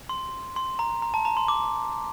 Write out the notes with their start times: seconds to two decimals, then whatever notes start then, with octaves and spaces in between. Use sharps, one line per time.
0.09 C6
0.56 C6
0.79 A#5
1.02 A#5
1.14 A5
1.25 A#5
1.37 C6
1.48 D6